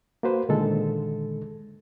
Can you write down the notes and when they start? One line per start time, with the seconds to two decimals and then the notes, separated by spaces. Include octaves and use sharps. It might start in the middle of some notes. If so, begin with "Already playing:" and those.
0.23 A#3 F#4 B4 C5
0.49 A#2 D3 D#3 G#3 A4